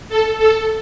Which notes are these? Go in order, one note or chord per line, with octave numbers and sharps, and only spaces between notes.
A4
A4